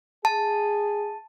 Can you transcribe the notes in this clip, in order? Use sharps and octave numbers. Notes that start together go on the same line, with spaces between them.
G#4 A5